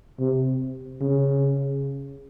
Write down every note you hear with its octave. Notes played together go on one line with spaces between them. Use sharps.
C3
C#3